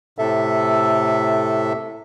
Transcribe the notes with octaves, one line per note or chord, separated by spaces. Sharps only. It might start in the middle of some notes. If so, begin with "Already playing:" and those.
A2 C3 A4 E5